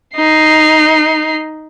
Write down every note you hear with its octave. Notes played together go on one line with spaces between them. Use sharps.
D#4 C7